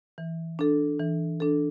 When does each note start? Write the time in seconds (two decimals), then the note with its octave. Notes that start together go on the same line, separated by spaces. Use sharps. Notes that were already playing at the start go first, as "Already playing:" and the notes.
0.18 E3
0.59 D4 A4
1.00 E3
1.40 D4 A4